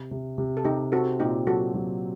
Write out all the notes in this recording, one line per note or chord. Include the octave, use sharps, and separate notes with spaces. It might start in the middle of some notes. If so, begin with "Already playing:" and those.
Already playing: C3
C3
C3
A4
C3 D#4 G4
C4 F#4 A4
A#2 D#4 G4
F#3 F#4 A4
F#3